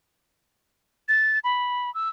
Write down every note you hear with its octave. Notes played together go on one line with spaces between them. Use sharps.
A6
B5
E6